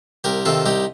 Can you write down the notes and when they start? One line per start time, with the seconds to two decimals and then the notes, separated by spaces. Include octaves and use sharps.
0.24 C2 G4 A#4
0.45 C3 D#3 F4 A4
0.66 C2 D#4 G4